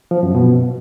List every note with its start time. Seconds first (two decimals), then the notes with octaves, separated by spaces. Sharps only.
0.11 F3
0.23 F#2
0.35 B2